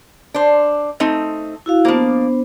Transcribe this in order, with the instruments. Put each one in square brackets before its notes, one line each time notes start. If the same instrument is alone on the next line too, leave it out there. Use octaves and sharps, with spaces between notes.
[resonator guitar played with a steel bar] D4 C5
A3 C4 D#4
[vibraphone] E4 F#4 F5
[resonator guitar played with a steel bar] F3 A#3 [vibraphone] B3 D4 C5